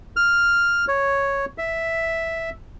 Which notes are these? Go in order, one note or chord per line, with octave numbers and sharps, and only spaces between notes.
F6
C#5
E5